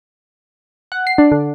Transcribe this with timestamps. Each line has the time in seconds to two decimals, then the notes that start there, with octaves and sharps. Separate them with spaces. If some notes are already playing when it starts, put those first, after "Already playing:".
0.92 F#5
1.07 C7
1.18 D4
1.32 D3